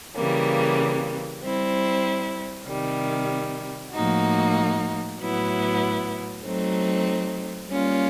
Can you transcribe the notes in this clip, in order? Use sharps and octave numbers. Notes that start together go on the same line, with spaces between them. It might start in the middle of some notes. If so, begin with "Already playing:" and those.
C#3 E3 G3 A#3
G3 C4 E4
C3 D#3 G3
A2 F3 A#3 D#4 F#4
A2 F#3 B3 E4
F#3 A3 C4 D#4
G3 A#3 C#4 F4